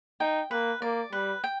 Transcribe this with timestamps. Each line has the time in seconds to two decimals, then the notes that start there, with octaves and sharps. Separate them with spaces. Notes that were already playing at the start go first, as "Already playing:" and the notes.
0.20 D#4 G5
0.51 A#3 B4
0.81 A#3 D5
1.12 G3 B4
1.44 G5